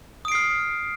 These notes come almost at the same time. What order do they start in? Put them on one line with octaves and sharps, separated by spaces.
D#6 D7 C7 F6